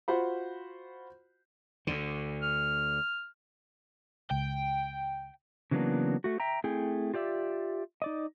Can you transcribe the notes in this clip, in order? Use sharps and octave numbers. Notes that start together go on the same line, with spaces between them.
F4 F#4 C5 F#5 B5
D2 D3
F6
C#2 G5
C#3 E3 F#3 A#3 B3 D4
A3 F#4
E5 G5 A#5
A3 C4 E4 G#4 G5 G#5
F4 G4 D5 E5
D#4 D5 D#5